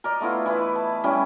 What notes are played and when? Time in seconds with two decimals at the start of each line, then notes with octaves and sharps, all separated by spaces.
0.04 A#4 D5 D#5
0.21 A3 B3 E4 F4
0.46 E3 E4 B4
0.75 A5
1.04 G3 C#4 E4 D#5